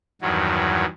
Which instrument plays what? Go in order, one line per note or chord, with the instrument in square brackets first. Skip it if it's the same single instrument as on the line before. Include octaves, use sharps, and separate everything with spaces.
[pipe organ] E2 G2 D#3 F#3